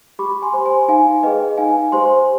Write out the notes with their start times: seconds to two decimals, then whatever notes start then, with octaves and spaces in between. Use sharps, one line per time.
0.19 G4 B5 D6
0.42 G#5 C6
0.53 C5
0.65 G#5 C6
0.88 D#4 F5 G#5
1.23 G#4 B4 D#5 G5
1.57 D#4 F5 G#5
1.92 G4 C5 G#5 C6